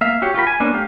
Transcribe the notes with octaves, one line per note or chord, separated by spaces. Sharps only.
A#3 E5 F5
F#4 G4 C#5
F4 G4 A#4 B5
G#5
A#3 B3 C#4 D4
A3 G4 F5